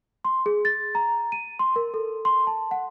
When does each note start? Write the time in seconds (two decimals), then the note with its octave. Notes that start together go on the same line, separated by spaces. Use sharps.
0.25 C6
0.46 G#4
0.65 A6
0.95 A#5
1.32 D#7
1.59 C6
1.76 A#4
1.94 A4
2.25 C6
2.47 A5
2.71 F#5